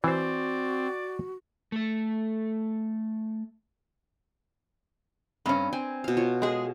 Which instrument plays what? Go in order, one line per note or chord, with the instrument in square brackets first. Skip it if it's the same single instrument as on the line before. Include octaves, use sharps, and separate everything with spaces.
[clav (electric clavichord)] E3 C5 [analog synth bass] C4 [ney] F#4 [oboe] D5
[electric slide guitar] A3 A4
[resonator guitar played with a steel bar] G2 C#4 [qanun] C4 B4 A#5
[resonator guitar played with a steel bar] C4 [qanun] G#5
[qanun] B2 F5
F4 C#5
[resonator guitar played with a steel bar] G#3 G#4